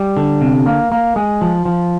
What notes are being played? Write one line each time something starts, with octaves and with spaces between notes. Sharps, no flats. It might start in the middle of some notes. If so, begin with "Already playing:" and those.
Already playing: G3
D3
C3
A#3
A#3
G#3
F3
F3